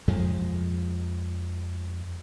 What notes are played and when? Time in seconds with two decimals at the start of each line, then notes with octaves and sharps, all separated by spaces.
0.08 F2 F3 G#3